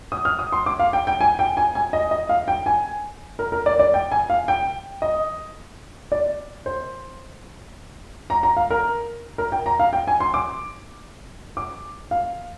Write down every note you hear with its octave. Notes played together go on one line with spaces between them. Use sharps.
D#6
F6
D#6
C6
D6
F5
G5
G5
G#5
G5
G#5
G#5
D#5
D#5
F5
G5
G#5
A#4
A#4
D5
D5
G5
G#5
F5
G5
D#5
D5
C5
A#5
A#5
F5
A#4
A#4
G5
A#5
F5
G5
G#5
C6
D6
D6
F5